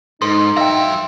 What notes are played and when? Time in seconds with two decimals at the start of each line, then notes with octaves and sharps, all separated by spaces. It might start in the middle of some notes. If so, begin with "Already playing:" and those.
0.22 G#2 D#4 A4 C6
0.57 F#3 E5 F5 G5